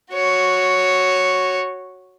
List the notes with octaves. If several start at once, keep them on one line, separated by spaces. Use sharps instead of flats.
F#4 C#5